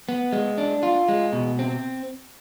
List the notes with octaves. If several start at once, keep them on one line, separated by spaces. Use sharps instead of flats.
B3
G#3
D4
F4
G#3
B2
C4